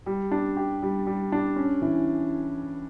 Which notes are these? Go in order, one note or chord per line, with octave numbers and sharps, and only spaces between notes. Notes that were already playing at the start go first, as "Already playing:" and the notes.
G3
D4
G4
G3
G3
D4
C#4
E3